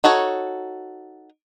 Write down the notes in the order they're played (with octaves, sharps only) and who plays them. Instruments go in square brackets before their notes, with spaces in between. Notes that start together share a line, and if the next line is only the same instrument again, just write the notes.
[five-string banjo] D#4 F#4 A4 C#5